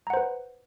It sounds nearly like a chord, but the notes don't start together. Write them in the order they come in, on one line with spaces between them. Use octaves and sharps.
A#5 F#5 C5 B4